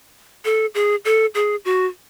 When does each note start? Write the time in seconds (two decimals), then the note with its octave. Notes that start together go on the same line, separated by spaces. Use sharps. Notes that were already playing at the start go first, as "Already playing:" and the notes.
0.45 A4
0.75 G#4
1.05 A4
1.35 G#4
1.65 F#4